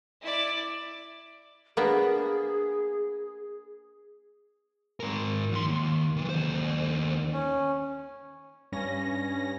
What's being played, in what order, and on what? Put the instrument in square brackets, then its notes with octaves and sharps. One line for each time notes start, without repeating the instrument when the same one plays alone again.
[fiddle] E4 D5
[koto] A#3 B3 D4 [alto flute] G#4
[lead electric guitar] G#2 A#4
E2 C6
D#2
D#3 B4
D#2 C5
[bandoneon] C#4
[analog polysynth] G2 C#4 A#6